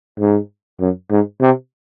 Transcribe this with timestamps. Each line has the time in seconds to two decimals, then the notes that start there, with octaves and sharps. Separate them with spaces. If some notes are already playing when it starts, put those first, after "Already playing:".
0.19 G#2
0.80 F#2
1.11 G#2
1.41 C3